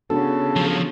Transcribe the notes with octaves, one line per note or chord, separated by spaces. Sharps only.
C#3 B3 D4 F#4 A4
F3 F#3